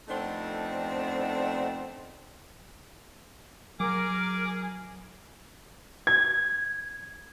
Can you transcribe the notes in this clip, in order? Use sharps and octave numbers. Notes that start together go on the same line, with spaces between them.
F2 A3 B3 C4 D4 D#4
F#3 G#4 A#4 D6 F6
G#6